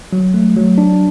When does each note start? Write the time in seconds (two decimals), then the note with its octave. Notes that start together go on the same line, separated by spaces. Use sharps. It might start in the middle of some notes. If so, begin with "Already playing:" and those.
0.13 F#3
0.34 A3
0.56 F#3
0.78 D4